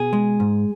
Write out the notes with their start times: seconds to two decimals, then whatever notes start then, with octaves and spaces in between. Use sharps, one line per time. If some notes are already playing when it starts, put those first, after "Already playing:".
Already playing: B2 G#4
0.13 G#3
0.40 G#2